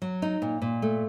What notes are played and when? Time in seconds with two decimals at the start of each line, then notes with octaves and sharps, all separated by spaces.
0.02 F#3
0.22 D#4
0.42 A#2
0.62 A#2
0.82 A3